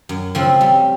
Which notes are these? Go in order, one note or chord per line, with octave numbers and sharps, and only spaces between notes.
F#2
C#3 F3 A3 C4
G3